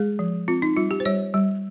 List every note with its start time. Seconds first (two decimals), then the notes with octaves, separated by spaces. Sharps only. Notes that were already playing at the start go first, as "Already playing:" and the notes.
Already playing: G#3 G#4
0.19 F3
0.48 C4 F4
0.62 D#4
0.77 G3 F4
0.91 G4
1.00 C5
1.05 G3 C#5
1.34 G3